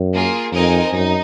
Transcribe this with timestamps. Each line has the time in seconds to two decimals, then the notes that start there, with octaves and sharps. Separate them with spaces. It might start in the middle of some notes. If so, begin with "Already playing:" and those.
Already playing: F#2
0.13 A#3 F4 G#4
0.53 F2 C4 D#4 A#4 D#5 G#5
0.92 F#2 D#4